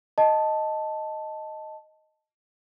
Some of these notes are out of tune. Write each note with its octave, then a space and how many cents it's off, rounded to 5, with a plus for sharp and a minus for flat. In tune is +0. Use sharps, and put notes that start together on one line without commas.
D#5 +0 A5 +0